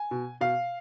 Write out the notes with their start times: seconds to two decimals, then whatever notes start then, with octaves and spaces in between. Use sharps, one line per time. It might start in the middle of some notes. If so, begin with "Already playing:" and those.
Already playing: G#5
0.11 B2
0.41 B2 F5